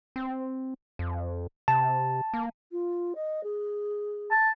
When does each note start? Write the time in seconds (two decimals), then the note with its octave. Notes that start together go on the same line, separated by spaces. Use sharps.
0.16 C4
0.99 F2
1.68 C3 A5
2.34 A#3
2.71 F4
3.15 D#5
3.43 G#4
4.31 A5